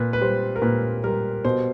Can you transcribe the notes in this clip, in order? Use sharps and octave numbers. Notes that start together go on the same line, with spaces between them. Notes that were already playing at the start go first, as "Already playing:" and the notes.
Already playing: A#2 B4
B4
G3 C5
A#4
A#2 B4
G3 A#4
B2 C5